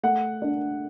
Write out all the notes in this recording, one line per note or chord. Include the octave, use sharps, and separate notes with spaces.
A3 F#5
D4